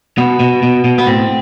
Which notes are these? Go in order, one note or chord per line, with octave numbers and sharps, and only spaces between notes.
B2 B3
B2
B2
B2
B3
A2 C4